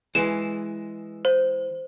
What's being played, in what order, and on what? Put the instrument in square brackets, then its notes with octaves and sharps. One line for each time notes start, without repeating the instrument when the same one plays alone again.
[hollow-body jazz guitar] E3 G#3 [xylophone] E7
[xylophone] C5